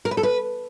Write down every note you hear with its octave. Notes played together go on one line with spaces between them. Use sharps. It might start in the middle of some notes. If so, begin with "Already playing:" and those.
A#4
B4
A4
B4